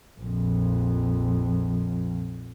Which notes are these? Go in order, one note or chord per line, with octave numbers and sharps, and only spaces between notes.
A#1 F2